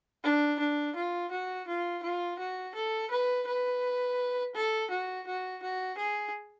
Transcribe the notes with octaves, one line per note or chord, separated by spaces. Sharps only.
D4
D4
F4
F#4
F4
F4
F#4
A4
B4
B4
A4
F#4
F#4
F#4
G#4